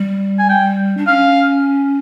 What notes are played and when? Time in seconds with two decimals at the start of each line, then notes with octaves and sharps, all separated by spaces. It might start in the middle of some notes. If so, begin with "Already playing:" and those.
Already playing: G3
0.39 G#5
0.49 G5
0.97 D4
1.07 C#4 F5